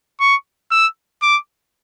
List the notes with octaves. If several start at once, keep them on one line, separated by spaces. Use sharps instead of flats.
C#6
E6
D6